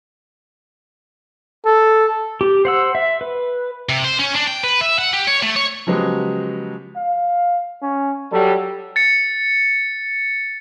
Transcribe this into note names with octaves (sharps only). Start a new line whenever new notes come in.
A4
G4
C5 F#5 E6
E5
B4
C3
C5
C#4
D4
G5
B4
E5
F#5
G4
C#5
A3
C#5
C#3 F3 F#3 G#3 B3 G4
F5
C#4
F#3 G3 A4
A6 C#7